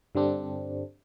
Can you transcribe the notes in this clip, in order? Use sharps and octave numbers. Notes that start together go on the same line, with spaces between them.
G2 D3 G3 C4 D4